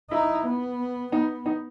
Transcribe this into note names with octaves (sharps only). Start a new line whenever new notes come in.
D#4 E4
B3
B3 D#4
D#4